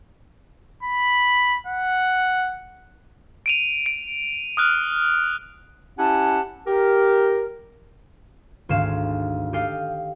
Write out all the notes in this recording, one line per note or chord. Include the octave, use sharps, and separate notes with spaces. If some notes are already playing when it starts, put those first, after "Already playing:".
B5
F#5
D7 D#7 F7
D7
D#6 F6 F#6
C#4 E4 G4 F#5 G#5 A5
G4 A#4
G#1 D2 G#2 G#3 F5 E7
G4 A4 D#5 F5 G5